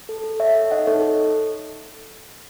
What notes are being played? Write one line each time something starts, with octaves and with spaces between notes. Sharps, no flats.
A4
A4
A4 C#5 E5
A4
D#4 D#5 F#5
D#4 A4 C#5
A4